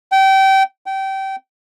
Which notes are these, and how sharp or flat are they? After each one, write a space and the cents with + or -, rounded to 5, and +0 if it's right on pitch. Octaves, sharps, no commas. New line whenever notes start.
G5 -25
G5 -25